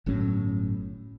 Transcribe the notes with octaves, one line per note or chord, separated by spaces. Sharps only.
G1 A2 F#3 C#4